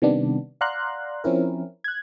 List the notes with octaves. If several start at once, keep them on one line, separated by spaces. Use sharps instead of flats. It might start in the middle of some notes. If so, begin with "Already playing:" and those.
C3 D#3 G3 B3 D4
D5 F5 F#5 A#5 C6 F#6
F3 C4 C#4 E4 A#4
F#6 G#6